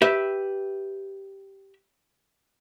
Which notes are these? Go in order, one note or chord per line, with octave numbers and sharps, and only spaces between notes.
G4 B4 E5